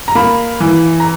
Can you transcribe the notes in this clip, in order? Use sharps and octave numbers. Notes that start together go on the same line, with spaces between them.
A#5
A#3 B5
E3
A#5